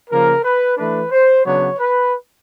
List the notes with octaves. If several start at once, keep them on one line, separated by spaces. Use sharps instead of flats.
C#3 F3 A#3 A#4
B4
E3 A3 D4 B4
C5
C#3 F#3 B3 D4 C#5
B4